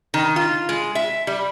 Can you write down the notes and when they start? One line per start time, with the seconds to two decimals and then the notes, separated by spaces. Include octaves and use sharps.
0.14 D#3
0.36 F4
0.69 G#3
0.95 E5
1.27 G3